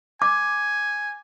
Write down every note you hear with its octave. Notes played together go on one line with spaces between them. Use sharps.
G#5 D6